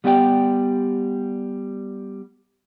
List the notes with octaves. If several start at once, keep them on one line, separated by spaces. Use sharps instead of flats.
G3 B3 G4 D5 G5